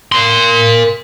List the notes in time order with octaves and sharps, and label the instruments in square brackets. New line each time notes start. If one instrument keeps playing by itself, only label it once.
[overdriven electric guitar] A#4 C6